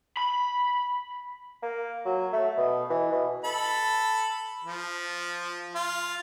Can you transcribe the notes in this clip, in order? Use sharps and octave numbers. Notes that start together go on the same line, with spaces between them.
B5
A#3
F#3
A3
B2
E3
B2
A4 B5
F3
F4